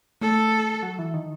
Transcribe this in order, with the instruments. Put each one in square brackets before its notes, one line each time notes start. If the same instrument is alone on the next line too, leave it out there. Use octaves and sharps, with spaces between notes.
[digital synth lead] A3 [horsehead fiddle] A4
[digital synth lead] F#3
E3
D#3